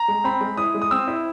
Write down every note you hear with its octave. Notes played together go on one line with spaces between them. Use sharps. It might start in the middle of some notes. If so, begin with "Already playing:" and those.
Already playing: A#5
G#3
C4 B5
G#3
E4 D#6
G#3
D#6
C4 E6
E4